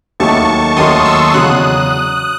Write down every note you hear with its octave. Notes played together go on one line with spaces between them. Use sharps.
D#2 D#3 F#3 A3 A5 C#6
D#2 D#3 F#3 A3 C6 D#6
C#6 E6
E2 C#3 F#3 D#6 F#6